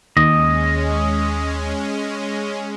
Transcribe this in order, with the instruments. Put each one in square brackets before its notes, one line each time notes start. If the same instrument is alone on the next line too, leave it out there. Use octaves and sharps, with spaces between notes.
[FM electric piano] D#2 [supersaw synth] G#3 C#4 [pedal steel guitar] D#5